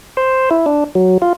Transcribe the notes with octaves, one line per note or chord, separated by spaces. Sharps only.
C5
E4
D4
F#3
F4